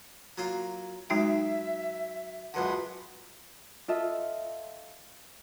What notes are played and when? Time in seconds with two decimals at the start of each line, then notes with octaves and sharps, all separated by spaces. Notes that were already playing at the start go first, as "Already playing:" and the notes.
0.38 F#3 A#3 F4
1.10 F#3 G#3 D#4 E5 G5
2.54 C#2 F#2 D3 B4 F#5 C6
3.88 F4 A4 D#5 E5